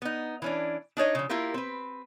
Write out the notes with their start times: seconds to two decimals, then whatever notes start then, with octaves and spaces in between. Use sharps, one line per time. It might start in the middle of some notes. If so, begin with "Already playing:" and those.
0.02 B3 D#4
0.42 E3 C#4 D4
0.97 D4 D#4 C#5 D#5
1.15 C#3 F3
1.29 A#3 E4 F4 G4 A#4
1.54 C4 B4